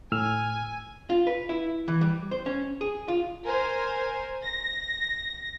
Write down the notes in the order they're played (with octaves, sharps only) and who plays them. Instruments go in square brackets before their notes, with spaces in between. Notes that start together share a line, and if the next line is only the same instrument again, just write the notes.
[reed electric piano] A2 E6 F6 [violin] G#5
[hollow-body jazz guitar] F4
B4
E4
E3
G3
C5
C#4
G#4
F4
[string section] A#4 C5 G#5
A#6